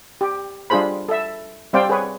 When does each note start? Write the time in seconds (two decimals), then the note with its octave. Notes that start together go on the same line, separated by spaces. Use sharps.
0.21 G4
0.70 G3 D4 F4 G#4 C5 B5
1.09 A4 E5
1.73 G3 C4 C5 D5 F5 G5
1.89 G#4 B4 C#5